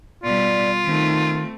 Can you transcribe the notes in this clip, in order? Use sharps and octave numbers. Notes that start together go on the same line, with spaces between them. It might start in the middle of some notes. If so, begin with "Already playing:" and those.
B2 G3 F4 D5
D#3 A3 C4